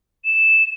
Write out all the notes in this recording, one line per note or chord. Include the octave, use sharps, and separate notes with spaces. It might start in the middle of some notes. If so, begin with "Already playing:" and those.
E7